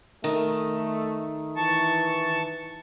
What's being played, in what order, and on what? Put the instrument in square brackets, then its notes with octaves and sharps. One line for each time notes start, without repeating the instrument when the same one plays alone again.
[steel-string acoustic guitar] D#3 [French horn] A3
[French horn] E3 [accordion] A5 C#6